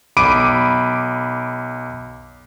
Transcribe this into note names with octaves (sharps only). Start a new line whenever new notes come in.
B1 B5 D6 D7 D#7